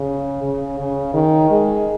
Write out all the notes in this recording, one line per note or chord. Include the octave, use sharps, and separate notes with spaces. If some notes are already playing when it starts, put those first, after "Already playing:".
Already playing: C#3
C#3
C#3
D#3
G#3